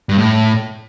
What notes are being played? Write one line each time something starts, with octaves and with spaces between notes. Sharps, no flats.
G2
A2